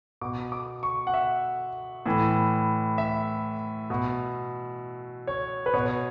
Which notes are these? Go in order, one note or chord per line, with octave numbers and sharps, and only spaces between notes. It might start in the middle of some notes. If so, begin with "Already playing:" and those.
B2 D6
D6
C#6
F#5
E5
A2 E3
E5
B2
C#5
B4
B2 C#5